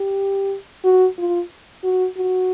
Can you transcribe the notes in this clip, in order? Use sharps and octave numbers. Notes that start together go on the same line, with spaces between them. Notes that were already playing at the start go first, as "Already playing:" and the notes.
Already playing: G4
F#4
F4
F#4
F#4